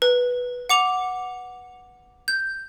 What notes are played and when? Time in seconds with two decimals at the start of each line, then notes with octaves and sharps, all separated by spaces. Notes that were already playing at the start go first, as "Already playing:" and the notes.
0.02 B4
0.69 F#5 D6 F7
2.28 G6